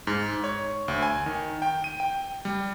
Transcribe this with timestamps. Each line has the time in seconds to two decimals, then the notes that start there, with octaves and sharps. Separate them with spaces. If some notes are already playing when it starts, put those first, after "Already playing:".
0.07 G#2
0.44 C#5
0.88 D2
1.02 G#5
1.26 D#3
1.62 G5
1.84 D#7
2.00 G5
2.45 G3